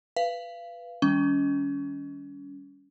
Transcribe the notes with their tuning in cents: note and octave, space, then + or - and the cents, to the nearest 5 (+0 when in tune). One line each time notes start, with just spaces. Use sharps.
B4 +0 F5 -25
D#3 +0 G3 +15 C#4 +30